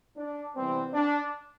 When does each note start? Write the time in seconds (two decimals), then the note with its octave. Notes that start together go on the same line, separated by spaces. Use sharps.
0.17 D4
0.56 C3 E3 G3 B3 C4
0.93 D4